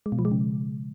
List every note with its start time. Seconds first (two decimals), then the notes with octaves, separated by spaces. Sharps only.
0.06 G#3
0.12 B2
0.19 F3
0.25 G#3
0.31 C#3